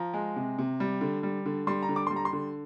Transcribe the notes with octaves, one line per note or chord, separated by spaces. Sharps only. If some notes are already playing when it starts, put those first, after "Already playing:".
Already playing: F3 A#5
G#3
C3
C3
G3
D3
G3
D3
G3 C6
A#5
D3
D6
G3 C6
A#5
C6
D3